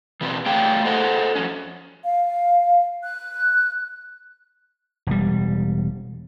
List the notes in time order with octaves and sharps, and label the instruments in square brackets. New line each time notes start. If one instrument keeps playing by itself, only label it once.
[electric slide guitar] E2 B2 C4 B4
A3 G4 G#4 C#5 F5 G5
A4 C5 D#5 F#5
F2 C#4
[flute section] F5
F#6
[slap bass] E1 G3